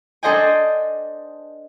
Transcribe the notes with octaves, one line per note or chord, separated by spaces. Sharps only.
D4 A4 C5 D#5 G5 G#5